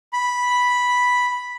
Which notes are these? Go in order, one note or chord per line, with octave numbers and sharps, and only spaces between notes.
B5